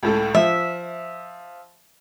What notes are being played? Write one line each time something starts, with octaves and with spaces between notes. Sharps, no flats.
C#2 A2 A4
F3 E5